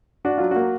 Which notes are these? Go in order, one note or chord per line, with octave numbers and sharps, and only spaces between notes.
D4 F#4
F#3 F4
A#3 F#4